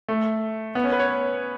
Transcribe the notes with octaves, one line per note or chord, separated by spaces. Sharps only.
A3
B3
C#4
B4
C#5